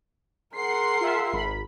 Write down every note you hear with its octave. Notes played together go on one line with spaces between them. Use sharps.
G#4 A#4 F#5 C6 C7
F4 E5
G#1 B5